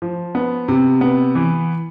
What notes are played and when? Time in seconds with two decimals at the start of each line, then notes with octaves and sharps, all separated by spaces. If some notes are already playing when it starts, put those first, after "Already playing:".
0.02 F3
0.35 B3
0.68 C3
1.01 B3
1.35 E3